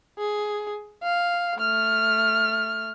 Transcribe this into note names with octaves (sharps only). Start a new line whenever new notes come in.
G#4
F5
A3 F6